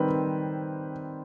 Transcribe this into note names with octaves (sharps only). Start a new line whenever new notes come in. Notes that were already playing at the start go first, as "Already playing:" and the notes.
Already playing: D#3 G3 C4 B4